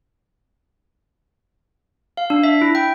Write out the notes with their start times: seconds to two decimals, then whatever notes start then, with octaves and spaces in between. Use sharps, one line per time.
2.17 F5
2.30 D4
2.43 E5
2.62 E4
2.75 G5